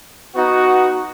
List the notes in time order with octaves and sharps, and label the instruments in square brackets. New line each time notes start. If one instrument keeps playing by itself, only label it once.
[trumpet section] B3 D#4 F#4